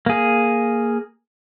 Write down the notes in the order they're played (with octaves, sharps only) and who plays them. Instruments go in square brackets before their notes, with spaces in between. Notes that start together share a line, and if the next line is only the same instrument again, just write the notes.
[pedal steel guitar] A#3 G#4